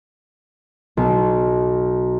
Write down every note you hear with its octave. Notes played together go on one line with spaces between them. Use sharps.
B1